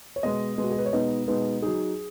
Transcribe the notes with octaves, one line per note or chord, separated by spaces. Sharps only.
C#5
B2 G#3 B3 D#5
B2 G#3 B3
F#4
G#4
B4
C#5
B2 G#3 B3 D#4 D#5
B2 G#3 B3 D#4
F#3 D#4 G#4